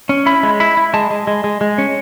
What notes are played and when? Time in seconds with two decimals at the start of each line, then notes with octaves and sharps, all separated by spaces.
0.09 C#4
0.26 E4 B5
0.43 G#3
0.60 E4 B5
0.77 E4
0.94 G#3 A5
1.11 G#3
1.27 G#3
1.44 G#3
1.61 G#3
1.78 C#4